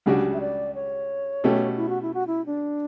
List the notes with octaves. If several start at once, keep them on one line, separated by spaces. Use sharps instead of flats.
C#2 C#3 G3 D4 F#4
E5
D5
C#5
B2 A3 C#4 G4
E4
F#4
E4
F#4
E4
D4